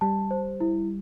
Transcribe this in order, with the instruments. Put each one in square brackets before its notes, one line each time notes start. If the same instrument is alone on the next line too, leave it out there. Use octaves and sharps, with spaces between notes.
[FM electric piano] G3 [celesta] A5
[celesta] C5
E4